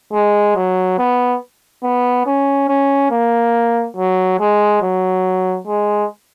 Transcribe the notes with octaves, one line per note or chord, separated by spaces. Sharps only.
G#3
F#3
B3
B3
C#4
C#4
A#3
F#3
G#3
F#3
G#3